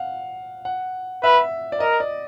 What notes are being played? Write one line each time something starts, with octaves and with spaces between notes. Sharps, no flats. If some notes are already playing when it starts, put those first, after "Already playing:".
Already playing: F5 F#5
F#5
B4 E5
D5
A#4 D#5
D5